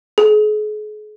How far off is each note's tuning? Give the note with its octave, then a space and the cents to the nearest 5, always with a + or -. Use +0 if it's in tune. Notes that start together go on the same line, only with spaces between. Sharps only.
G#4 +40